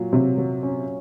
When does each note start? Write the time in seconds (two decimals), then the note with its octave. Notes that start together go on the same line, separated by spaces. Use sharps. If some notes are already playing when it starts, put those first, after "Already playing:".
Already playing: A#2 F#3
0.13 C3 F#3
0.38 F#3
0.63 C#4